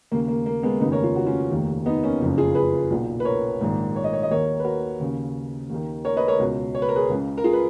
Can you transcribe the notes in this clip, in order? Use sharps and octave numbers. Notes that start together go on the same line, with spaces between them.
D#2 C#3 A#3
A#3
A#3
G#3 B3
F1 D#2 C#3 B3 D#4
A#4 C#5
F4
F#4
C#4 F4
F1 D#2 D#3
B3 D#4
A#3 C#4
F#1 F2 C#3
F4 G#4
G#4 B4
B1 A#2
B4
A#4 C#5
A#1 G#2 D#3
C#5
D#5
C#5
D#5
D#2 D#3 A#4 C#5
B4
F#4 A#4
D#2 C#3
D#2 D#3
A#4 C#5
B4 D#5
A#4 C#5
C#2 B2
C#5
B4
A#4
G#4 B4
C#2 C#3
A#4
F4 G#4
B4